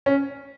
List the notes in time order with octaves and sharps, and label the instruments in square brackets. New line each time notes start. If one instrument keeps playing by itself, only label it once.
[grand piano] C#4